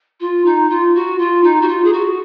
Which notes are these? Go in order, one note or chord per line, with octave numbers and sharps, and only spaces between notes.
F4
D#4
F4
F#4
F4
D#4
F#4
F4
G#4
F#4